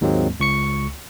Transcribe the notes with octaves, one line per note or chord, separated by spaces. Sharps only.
D#2 G#2 F#3 G#3 A#3 C4
C#2 C#6 C#7